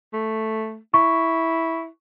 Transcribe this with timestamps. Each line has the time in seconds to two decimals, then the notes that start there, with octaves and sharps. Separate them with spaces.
0.13 A3
0.94 E4 C#6